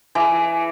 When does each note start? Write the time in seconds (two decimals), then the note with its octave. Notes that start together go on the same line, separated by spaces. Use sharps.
0.15 E3